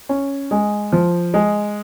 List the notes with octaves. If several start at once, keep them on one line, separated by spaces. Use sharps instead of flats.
C#4
G#3
F3
G#3